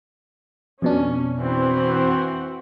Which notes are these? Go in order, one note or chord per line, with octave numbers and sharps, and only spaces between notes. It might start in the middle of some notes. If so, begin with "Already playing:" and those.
F2 B2 C#4 D4
E3 C4 F#4